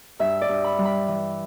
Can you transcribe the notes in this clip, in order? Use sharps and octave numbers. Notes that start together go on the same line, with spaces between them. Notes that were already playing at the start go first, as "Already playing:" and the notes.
G2 E5
D5
G2
B5
G3
B5
E3